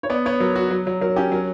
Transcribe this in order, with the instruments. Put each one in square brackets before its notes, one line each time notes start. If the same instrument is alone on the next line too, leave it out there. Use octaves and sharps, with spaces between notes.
[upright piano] C#5
[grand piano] B3 [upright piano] D5
[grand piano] B3 [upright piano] C#5
[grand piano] F#3 [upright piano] A#4
[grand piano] F#4
F#3
F#3
[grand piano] F#3 [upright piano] A#4
[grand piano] C#4 [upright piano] G4
[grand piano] F#3 [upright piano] A#4